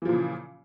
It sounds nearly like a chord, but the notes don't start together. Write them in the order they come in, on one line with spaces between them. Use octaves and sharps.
E3 F3 A#2 C#3